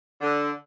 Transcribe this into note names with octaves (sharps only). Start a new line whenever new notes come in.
D3